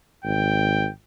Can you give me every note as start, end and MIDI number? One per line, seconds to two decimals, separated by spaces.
0.24 0.87 32
0.24 0.91 79